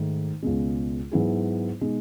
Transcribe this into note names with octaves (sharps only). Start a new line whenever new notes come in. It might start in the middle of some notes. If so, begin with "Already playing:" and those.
Already playing: G#2 D#3 A3
C#2 B2 G#3
G#2 F#3 B3 E4 G#4
B2 G#3 D#4